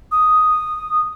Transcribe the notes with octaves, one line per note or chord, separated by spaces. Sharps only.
D#6